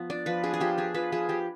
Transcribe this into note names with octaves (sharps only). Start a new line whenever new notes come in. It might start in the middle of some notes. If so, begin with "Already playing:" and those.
Already playing: F3 B3
D4 D5
F3 B4
D4 G#4
G#4
F3 G4
D4 G#4
F3 B4
F3 G#4
F3 G4